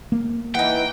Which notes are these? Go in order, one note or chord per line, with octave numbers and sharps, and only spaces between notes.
A#3
E3 D#4 F#5 G5